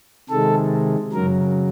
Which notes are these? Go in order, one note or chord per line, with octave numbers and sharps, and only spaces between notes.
C3 D#3 G#3 A4
F#2 C#3 F#3 A#4